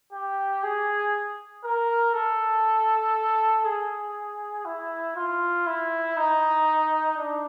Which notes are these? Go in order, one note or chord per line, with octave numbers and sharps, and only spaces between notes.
G4
G#4
A#4
A4
G#4
E4
F4
E4
D#4
D4